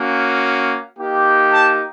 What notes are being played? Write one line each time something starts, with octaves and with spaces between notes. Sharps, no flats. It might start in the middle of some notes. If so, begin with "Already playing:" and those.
Already playing: A#3 C#4 F#4
A#3 D#4 G4
A5